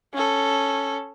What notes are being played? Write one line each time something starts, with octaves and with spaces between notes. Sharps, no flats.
C#4 A4